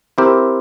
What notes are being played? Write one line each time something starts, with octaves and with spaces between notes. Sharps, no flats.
C4 E4 G4 A#4